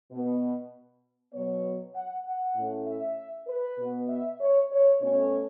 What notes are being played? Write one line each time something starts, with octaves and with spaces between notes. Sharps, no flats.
B2 B3
B2 F#3 B3 C#5
F#5
F#5
A2 A3 C#4
E5
B4
B2 B3
E5
C#5
C#5
B2 A3 C#4 C#5